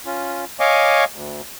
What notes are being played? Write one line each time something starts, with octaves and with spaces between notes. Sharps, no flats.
C#4 F4
C#5 D#5 F5 G#5 C#6 D6
D2